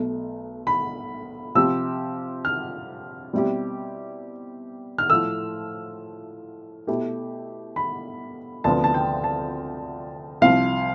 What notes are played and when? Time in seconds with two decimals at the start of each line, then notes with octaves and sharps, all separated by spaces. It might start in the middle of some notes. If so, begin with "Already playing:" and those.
Already playing: B1 B2 A3
0.67 B5
1.55 C3 F3 C4 G4 E6
2.45 F6
3.33 B2 G3 C4 E4 G4
4.98 F6
5.10 A2 F3 A3 E6
6.87 B2 A3 E4 G4
7.76 B5
8.64 D2 C3 F3 B3 A5
8.84 A5
8.94 G5
9.24 A5
10.41 C2 C3 F3 F5